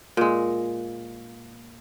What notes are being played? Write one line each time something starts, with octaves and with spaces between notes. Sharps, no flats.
A#2 G#3